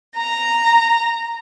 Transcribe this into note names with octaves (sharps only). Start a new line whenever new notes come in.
A#5